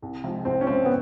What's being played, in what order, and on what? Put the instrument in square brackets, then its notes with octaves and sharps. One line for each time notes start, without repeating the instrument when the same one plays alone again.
[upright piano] C2
C3 F3 G#3
[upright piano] C2 [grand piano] C4
[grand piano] C#4
[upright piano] C3 F3 G#3 [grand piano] C4
[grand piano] B3